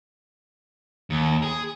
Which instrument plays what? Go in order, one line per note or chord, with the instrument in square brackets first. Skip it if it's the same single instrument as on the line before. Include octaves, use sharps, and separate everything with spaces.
[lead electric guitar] D#2
G#4